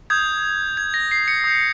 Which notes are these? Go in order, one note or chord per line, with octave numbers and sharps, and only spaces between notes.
D#6 G6 G#6
G#6
A#6
C7
C#7
D#6 G6